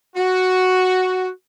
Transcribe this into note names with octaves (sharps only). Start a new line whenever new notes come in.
F#4